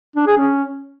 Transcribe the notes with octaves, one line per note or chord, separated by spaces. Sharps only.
D4
G#4
C#4